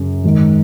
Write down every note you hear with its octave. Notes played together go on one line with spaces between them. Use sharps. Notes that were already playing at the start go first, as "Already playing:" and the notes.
Already playing: F#2 C#3
G#2 D#3